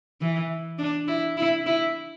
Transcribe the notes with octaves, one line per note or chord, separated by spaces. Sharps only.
E3
D4
E4
E4
E4